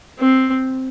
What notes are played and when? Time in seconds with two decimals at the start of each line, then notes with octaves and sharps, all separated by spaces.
0.20 C4